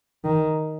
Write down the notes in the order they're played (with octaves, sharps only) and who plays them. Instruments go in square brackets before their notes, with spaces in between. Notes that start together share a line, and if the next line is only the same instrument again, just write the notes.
[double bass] D#3